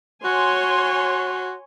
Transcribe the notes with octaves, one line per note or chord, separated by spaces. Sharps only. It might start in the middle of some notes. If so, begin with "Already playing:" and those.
F#4 C#5 G#5 C6